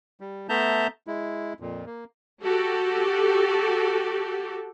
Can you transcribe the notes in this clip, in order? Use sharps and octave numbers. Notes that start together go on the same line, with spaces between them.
G3
A3 B3 E5 A5 A#5 G6
G#3 E4
F2 A#2
A#3
F#4 G4 A4